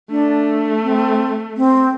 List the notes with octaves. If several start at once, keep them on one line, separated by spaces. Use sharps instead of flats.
A3 D4
C4
C4